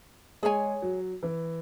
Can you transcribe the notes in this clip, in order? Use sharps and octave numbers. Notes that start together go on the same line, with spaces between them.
G#3 G#4 C#5 G#5
F#3
E3